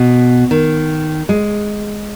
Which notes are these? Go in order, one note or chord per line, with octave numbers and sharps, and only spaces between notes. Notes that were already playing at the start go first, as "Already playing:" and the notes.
Already playing: B2
D#3
G#3